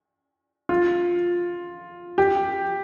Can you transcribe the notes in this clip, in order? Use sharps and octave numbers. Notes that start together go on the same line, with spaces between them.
F4
G4